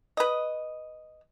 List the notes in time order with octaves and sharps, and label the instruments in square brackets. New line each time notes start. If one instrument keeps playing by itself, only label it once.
[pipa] B4 D#5